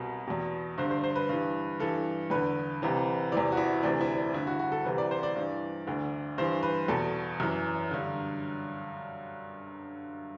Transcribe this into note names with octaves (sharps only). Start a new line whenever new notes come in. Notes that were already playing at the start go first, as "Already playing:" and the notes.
Already playing: C2 B2
E2 B2
G2 D3 C5
C5
C5
B4
G2 E3
G2 E3 A4
E2 D3 B4
C2 C3 E3
E2 C3 E3 D5
F#4
E4
D2 C3 E3 D4
E4
D4
G2 D3 E4
F#4
F#4
A4
C2 C3 E3 B4
D5
C5
D5
G2 E3
D2 D3
G2 E3 C5
B4
E2 B2 A4
F#2 E3
G2 D3